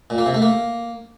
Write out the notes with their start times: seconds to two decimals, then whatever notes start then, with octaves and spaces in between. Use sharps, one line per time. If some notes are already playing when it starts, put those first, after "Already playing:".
0.10 A#2
0.18 A#3
0.26 C3
0.34 A3
0.42 A#3